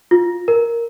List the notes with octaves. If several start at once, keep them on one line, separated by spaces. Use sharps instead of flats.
F4
A#4